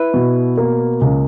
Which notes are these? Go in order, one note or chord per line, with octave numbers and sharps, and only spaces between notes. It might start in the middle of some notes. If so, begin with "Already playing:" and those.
Already playing: E4 B4
B2
A#3
C#2